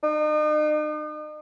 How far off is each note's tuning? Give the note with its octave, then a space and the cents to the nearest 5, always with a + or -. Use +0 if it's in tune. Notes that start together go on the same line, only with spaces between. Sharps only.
D#4 -40